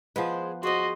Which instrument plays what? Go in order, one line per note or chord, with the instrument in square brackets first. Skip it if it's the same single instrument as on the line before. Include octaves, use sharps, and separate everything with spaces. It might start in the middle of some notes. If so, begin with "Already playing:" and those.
[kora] F3 B3 B4 [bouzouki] G#3 C5
[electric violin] F#4 D#5 [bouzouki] G#4 C5 [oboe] C6